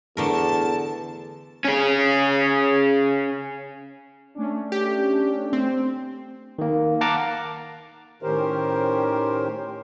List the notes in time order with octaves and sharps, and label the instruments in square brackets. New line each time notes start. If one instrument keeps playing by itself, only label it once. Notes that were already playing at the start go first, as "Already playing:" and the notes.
[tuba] E2 [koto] D3 A3 A#4 [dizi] A5
[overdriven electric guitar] C#4 G#4
[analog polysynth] A3 C#4 D4
[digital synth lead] G4
C4
[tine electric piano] D#3 A#3
F5 F#5 A5 A#5 D6
[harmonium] A2 D#3 C#4 G4 A#4 C5